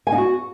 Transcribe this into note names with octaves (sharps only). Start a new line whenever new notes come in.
G#5
D#4
F#4